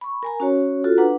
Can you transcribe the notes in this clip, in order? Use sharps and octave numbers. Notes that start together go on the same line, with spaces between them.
B5 C#6
A#4 G#5 A#5
C#4 F#4 C#5
F4 F#4 A4
D4 B4 F#5 A#5